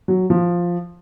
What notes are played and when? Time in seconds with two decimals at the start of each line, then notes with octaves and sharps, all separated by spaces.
0.08 F#3
0.30 F3